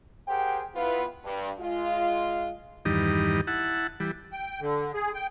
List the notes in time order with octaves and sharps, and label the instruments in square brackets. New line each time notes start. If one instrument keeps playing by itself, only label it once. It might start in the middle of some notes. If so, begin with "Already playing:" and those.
[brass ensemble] G4 G#4 A#4 C5 F#5 G5
B3 E4 F4 B4
G2
G#3 F4
[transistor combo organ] E2 G2 D#3 G3 D#4
E4 F#5 A5
E3 G3
[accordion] G5
D3
G#4
G5